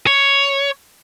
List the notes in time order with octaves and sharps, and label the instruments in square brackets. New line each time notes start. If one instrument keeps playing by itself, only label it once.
[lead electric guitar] C#5